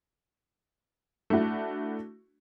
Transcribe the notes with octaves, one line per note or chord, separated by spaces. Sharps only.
A3 D4 E4 F#4